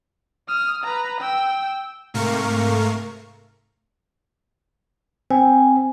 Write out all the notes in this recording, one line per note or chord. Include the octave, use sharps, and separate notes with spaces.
D#6 F6
B4 A#5
G5 E6
G#2 C3 A3 A#4 F5 C#6
C4 G#5